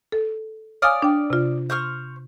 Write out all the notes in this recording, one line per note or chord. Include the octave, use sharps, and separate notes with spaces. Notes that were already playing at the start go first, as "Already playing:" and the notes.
A4
C#5 D5 F5 G#5 D#6 F6
D4 G5
C3 F4
C5 C#6 F6